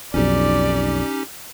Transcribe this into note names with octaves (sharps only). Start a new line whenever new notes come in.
B1 F2 C#4 D#4 G4 D5